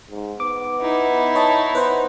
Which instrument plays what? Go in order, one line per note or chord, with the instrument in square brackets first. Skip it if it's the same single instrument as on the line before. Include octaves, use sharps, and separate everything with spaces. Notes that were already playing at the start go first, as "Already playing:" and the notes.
[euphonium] G#2
[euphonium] B3 [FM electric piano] D6
[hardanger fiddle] D#4 E4
[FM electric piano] C#5 D#5 A5
[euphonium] B3 [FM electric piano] B4 C5